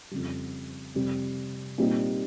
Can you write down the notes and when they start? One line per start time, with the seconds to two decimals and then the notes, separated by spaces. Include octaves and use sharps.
0.11 F2 C#3 G3
0.95 F2 C3 G3 C4
1.78 A#2 G3 C4 D#4 G4